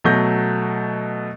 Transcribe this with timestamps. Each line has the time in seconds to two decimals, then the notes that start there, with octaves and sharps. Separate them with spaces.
0.04 B2 F#3 A3 C#6 G6 A#6